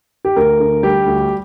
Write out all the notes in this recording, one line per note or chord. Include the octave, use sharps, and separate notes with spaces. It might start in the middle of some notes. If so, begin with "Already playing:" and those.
G4
D2 A#4
D3
G3 G4
D2